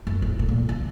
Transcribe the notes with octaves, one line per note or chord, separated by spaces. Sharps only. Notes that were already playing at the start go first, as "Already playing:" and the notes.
F#2
G#2
A2
A#2
C#3